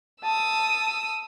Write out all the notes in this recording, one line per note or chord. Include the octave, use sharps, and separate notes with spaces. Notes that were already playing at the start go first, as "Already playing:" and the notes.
A5 D#6 E6